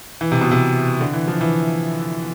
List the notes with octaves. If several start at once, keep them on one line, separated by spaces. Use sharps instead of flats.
E3
C3
B2
C3
D3
E3
F3
E3